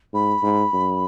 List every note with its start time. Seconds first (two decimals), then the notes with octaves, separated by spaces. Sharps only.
0.13 G#2 B5
0.43 G#2
0.73 F#2